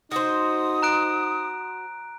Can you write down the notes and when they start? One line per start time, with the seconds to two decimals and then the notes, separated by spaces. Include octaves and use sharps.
0.11 D#4 F#4 C5 D#6
0.82 A#5 F#6 D7